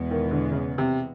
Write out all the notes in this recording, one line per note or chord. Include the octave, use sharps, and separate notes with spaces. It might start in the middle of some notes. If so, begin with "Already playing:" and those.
Already playing: E2 B2 G#3 B3
D#3
D3
C#3
C3